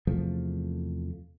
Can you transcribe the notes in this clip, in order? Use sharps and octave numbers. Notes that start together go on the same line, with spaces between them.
E2 C3 F3 A3